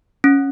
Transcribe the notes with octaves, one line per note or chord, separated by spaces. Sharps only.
C#4